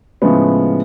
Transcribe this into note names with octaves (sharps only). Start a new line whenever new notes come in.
A2 C#3 F3 G#3 B3